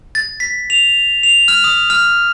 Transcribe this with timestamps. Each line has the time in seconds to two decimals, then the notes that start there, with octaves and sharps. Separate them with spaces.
0.15 A6
0.40 B6
0.70 F7
1.23 F7
1.48 F6
1.64 D#6
1.90 F6